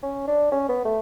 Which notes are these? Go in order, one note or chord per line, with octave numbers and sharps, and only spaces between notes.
C#4
D4
C#4
B3
A3